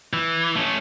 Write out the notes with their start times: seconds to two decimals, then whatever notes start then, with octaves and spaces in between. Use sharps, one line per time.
0.13 E3
0.56 A3 C#4